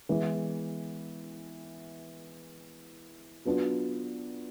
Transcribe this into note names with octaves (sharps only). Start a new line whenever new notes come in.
E3 G#3 B3 E4
F#3 B3 D4 F4